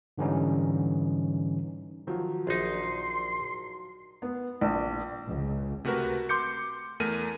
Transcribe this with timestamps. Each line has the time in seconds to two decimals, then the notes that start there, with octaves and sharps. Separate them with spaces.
0.18 G#2 D3 E3 G3 C#4 D#4
2.07 D#3 F3 F#3
2.47 A#1 D#4 C6
4.22 B3
4.61 A#1
5.27 C#2
5.85 C3 A3 F#4 A#4 B4
6.29 C6 D6 G6 C#7
7.00 E2 A3 A#4 D#7